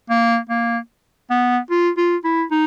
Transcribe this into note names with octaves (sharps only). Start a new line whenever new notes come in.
A#3
A#3
B3
F4
F4
E4
D#4